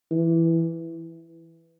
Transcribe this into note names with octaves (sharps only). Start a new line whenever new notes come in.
E3